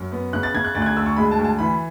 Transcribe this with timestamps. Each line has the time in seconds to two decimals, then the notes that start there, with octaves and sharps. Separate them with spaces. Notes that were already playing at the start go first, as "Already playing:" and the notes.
Already playing: F#2
0.12 B3
0.33 C#3 F#6
0.43 A6
0.54 C#3 G#6
0.64 F#6
0.75 D2 A6
0.82 F#6
0.86 G#6
0.96 D2 E6
1.06 C#6
1.16 G#3 B5
1.31 A5
1.39 D2
1.44 A5
1.59 E3 B5